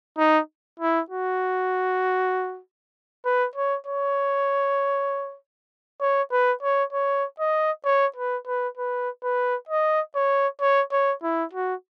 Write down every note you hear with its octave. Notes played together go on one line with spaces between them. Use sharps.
D#4
E4
F#4
B4
C#5
C#5
C#5
B4
C#5
C#5
D#5
C#5
B4
B4
B4
B4
D#5
C#5
C#5
C#5
E4
F#4